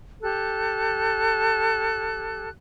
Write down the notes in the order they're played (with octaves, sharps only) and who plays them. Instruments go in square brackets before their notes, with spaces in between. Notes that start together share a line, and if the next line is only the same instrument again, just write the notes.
[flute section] G4 A4 F#6